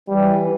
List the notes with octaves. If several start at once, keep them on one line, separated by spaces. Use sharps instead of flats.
E3 G3